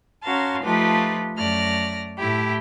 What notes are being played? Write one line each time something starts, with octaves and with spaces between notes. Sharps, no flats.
C#4 F#4 A#4 F5 A5 C6
F3 A3 D#4 F4 G4 B4
F#2 A3 D5 F6 A#6
A2 A3 E4 G4